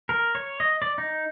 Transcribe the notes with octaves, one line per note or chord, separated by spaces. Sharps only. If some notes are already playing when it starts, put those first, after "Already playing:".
A#4
C#5
D#5
D5
D#4